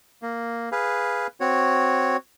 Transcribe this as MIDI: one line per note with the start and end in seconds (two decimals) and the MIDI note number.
0.22 0.69 58
0.72 1.27 68
0.72 1.27 71
0.72 1.27 77
1.40 2.17 60
1.40 2.17 66
1.40 2.17 73